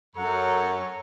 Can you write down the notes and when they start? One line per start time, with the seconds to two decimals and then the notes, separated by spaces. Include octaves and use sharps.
0.16 F#2 A4 C#5 F#5 A#5